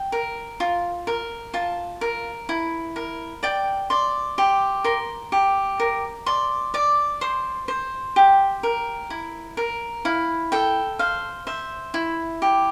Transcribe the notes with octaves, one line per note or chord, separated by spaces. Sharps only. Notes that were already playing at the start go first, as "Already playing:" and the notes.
Already playing: G5
A#4
F4
A#4
F4 A5
A#4
E4
A#4
D5 G5
D5 C6
G4 C6
A#4 C6
G4
A#4
D5 C6
D5 D6
C5 C6
C5
G4
A#4
E4
A#4
E4 F5
A4 G5
C5 F5
C5 E5
E4
G4